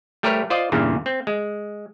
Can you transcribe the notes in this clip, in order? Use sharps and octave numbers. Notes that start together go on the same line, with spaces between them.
G3 A3 G4 A#4 B4 C#5
F4 C5 D5 D#5
E2 G2 A#2 C#3
C4
G#3